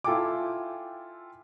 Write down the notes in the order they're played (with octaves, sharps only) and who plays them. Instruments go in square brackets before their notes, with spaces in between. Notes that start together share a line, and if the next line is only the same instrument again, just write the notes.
[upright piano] E4 F4 A4 G5 G#5 D6